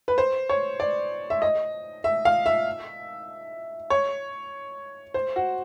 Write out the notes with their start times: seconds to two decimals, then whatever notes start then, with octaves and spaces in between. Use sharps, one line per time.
0.08 B4
0.18 C5
0.49 C#5
0.80 D5
1.30 E5
1.42 D#5
2.04 E5
2.25 F5
2.46 E5
3.90 C#5
5.14 C5
5.36 F#4